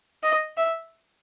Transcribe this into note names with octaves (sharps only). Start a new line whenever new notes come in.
D#5
E5